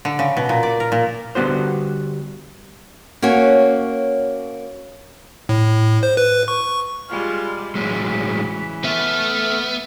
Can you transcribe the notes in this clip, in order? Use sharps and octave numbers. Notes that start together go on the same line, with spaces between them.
D3
C#3
B2
A#2
D5
A#4
A#2
D3 G3 B3 F#4 C5
A#3 C#4 F#4 C#5
A2
C5
B4
C#6
G3 G#3 F4 F6
A2 C#3 E3 F#3 G#3 B6
A3 B3 E5 F6